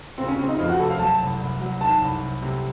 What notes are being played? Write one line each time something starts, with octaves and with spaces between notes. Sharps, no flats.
C#3 C4
C#4
C#3 C4
D#4
F2 F4
F#4
F1 A4
F5
F#3 A5
C2
C2
F#3
D#3 A5
C2
C2
C3